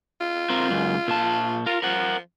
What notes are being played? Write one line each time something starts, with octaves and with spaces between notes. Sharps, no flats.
F4
C4 A#4
C#2 F#2
A#2 A5
F4 A#4
F3 A#4 F#5